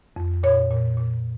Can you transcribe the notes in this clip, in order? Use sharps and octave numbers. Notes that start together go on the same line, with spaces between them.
F2
A#2 C#5
A#2
A#2